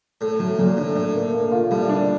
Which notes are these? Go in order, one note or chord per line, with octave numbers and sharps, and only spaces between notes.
A2 A3
A2 F#3
A#2 F#3
A2 D4
A2 D4
A#3
A#3
F4
A2 G3
D4